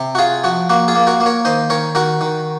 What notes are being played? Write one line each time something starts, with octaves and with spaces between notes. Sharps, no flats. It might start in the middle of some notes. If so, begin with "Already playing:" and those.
Already playing: C3
F#4
F4 G#4
F3 F#4
A#3 F#4
F4 G#4
A#3
F#4 A#4
A#3
A#4 C#5
D#3 C5 D#5
D#3 A#4 C#5
D#3 F#4 A#4
D#3